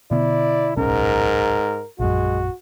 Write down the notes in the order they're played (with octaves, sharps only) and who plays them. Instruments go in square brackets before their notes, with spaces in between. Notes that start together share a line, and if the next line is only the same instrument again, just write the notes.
[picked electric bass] B2 D3 B3 [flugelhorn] E4 [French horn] D5
[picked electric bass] D1 B1 C#4 [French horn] G#2 [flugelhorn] A#4
[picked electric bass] A#1 F#2 [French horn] G#3 [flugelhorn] F#4